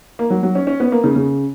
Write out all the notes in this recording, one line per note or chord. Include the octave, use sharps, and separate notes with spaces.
A#3
F#3
F#3
C#4
C#4
B3
A#3
C#3
C#3